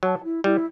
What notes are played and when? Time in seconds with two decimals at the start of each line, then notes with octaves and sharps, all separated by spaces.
0.03 F#3 A5
0.23 E4
0.44 G3 E4